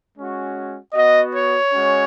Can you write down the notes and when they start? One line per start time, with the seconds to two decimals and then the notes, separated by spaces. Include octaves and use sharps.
0.14 G#3 C#4 F#4
0.93 B3 F#4 D#5
1.32 C#5
1.72 G#3 C#4 F#4